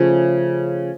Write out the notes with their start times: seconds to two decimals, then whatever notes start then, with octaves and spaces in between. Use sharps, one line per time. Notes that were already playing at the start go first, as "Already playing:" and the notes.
Already playing: C#3 F3 A3